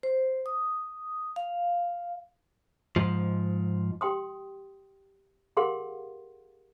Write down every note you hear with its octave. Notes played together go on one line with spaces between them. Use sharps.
C5
D#6
F5
G#2 F3
G4 G5 C6 D#6
G4 G#4 A#4 F5 F#5 C6